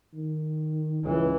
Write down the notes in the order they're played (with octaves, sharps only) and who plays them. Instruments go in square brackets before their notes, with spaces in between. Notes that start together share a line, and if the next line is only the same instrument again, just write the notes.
[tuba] D#3
[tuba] C#2 [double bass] E3